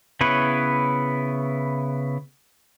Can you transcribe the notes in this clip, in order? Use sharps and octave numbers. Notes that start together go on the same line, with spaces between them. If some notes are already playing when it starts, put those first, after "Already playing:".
C#3 B3 E4 B4 C#5